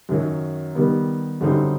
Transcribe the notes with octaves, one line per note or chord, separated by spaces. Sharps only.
F#2 D#3 F#3
D#3 G3 B3
F#2 D3 G3 C4 D#4